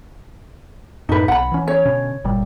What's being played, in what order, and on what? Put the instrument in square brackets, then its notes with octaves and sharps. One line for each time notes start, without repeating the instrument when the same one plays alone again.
[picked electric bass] F#2 A2 [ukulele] D#4 B4
[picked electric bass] B1 [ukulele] F#5 B5
[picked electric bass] E3 C#4
[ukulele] C#5
[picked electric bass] B2 D3 C#4
G1 A#2 G3